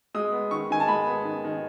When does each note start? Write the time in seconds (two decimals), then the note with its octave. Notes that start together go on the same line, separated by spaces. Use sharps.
0.15 G#3 D#6
0.32 B3
0.51 D#3 C#6
0.70 D#3 G#5
0.80 A5
0.88 G#3 B5
1.07 B3
1.25 D#3
1.45 D#3